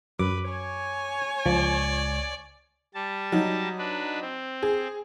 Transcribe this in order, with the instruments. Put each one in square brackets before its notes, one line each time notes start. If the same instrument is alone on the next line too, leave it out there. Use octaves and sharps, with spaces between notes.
[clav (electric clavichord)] F#2 [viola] B4 [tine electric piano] D6
[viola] C#5 G#5
[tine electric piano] C#2 [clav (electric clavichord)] F3 [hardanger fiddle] D5
[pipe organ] G3 A5
[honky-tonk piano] F#3 D#4
[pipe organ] D4 B4
C4
[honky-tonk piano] G#4